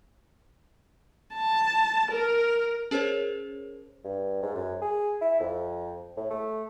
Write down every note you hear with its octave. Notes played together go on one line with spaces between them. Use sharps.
A5
A#4
C#4 G#4 A#4 C5 C#5
G2
G#2
F#2
G#4
E4
F2
A2
A3